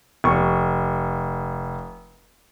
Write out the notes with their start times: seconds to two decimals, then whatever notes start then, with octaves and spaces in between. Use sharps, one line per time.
0.24 F1 C#6